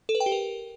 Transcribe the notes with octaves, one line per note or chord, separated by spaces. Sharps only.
A4
B4
G5
G4
A#4